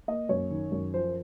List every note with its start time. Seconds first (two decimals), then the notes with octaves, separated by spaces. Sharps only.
0.08 A#3 D#5
0.29 F#2 C#5
0.50 D#3
0.72 F#2
0.94 F3 C5